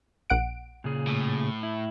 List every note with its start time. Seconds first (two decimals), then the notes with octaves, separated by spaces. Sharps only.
0.30 A#1 F#5 D7
0.84 A#2 C#3 G#4
1.07 A2
1.63 E4